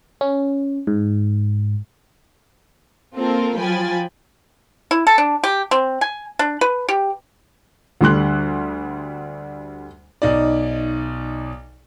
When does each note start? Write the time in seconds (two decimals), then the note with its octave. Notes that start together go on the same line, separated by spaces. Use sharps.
0.21 C#4
0.87 G#2
3.16 A#3 C4 F4 A4 A#4
3.59 F3 F#3 G5 G#5 B5 A6
4.91 E4
5.07 A4
5.18 D4
5.44 G4
5.71 C4
6.01 G#5
6.39 D4
6.61 B4
6.89 G4
8.01 D2 D3 G3 C6 F#6
10.22 B1 D#4 D5